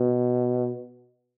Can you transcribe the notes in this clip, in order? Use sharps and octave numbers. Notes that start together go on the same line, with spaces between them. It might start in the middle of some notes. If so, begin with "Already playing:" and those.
Already playing: B2